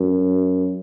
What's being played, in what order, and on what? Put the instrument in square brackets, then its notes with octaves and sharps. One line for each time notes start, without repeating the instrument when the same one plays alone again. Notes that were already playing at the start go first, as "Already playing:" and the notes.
Already playing: [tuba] F#2